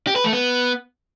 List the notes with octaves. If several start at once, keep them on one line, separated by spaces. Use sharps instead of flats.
G4
B4
A3
B3